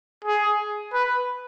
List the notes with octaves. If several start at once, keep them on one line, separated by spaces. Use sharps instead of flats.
G#4
B4